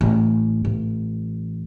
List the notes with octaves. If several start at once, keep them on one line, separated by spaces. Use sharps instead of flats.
A1
A1